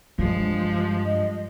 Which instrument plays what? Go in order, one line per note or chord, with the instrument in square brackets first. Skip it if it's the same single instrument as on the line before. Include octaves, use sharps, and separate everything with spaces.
[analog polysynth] G2 [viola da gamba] F3 G#3 [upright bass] F#3
[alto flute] D#5